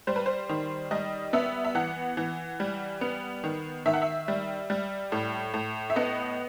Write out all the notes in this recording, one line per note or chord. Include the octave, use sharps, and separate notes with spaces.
G3 C5
B4
C5
D#3
G3 D#5
B3 E5
E5
E3 F#5
E3
G3
B3
D#3
D#3 E5
F#5
E5
G3
G3
A2
A2
E5
B3 D#5